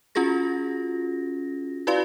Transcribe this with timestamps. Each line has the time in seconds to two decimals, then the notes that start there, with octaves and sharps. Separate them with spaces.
0.15 C#4 F4 F#4 G#4 A#6
1.87 E4 F#4 B4 D5 F5 C6